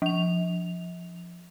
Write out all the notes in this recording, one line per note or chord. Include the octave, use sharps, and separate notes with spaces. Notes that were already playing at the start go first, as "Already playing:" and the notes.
F3 F7